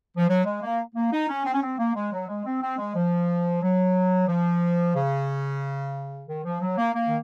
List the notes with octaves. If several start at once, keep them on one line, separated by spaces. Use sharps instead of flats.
F3
F#3
G#3
A#3
A#3
D#4
C#4
C4
C#4
C4
A#3
G#3
F#3
G#3
C4
C4
G#3
F3
F#3
F3
C#3
D#3
F3
F#3
A#3
A#3
D#3